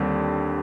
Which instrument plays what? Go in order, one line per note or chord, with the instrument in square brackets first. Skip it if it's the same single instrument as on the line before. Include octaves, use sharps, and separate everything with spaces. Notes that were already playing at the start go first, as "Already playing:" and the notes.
Already playing: [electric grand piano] D#2 D3 G3 C4